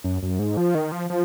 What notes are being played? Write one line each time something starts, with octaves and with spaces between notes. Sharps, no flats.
F#2
F#2
G#2
F3
D#3
F3
F3